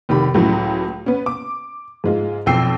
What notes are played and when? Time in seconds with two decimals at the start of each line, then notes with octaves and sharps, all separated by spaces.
0.09 F1 D#3 G4 B5
0.34 C#2 A2 E3 F#3 A3
1.06 B3 C#4
1.26 D6
2.04 G#2 G#3 F4
2.46 B1 F2 G5 E6 C7